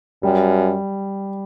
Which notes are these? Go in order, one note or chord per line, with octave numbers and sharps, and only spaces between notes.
F#2 G3